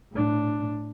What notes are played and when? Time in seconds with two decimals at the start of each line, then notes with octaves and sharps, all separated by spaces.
0.12 A2 D4